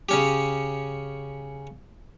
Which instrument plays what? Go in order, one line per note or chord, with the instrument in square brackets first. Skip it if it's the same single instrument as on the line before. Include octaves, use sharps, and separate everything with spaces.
[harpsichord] C#3 C#4 G4